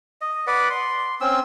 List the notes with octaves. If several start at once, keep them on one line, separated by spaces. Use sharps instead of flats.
D#5
B4 D5 F#5
C6
C4 C#4 E6